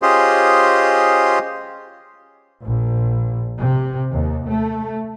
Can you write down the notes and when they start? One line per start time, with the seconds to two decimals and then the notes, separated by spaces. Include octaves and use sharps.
0.02 C#4 F4 G4 G#4 C5 D#5
2.64 A#1
3.59 C3
4.11 D#2
4.48 A3